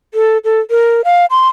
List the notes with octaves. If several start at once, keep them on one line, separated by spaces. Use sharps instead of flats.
A4
A4
A#4
F5
C6